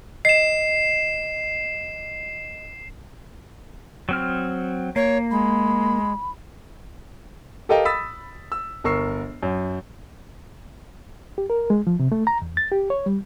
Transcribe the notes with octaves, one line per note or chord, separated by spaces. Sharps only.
D#5 C7 E7
F#3 C4 F6
A#3 C#5
G#3 B5
G4 A4 A#4 D#5 F5 G5
B5 D#6 E6 A6 B6
E6
G1 A#4 C#6 E6 C7
F#2
G4
A#4
G#3
F3
C3
A3
A#5
E2
A6
G4
C#5
G3